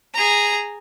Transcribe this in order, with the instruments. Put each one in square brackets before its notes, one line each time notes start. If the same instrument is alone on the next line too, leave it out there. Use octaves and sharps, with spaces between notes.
[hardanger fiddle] G#4 A#5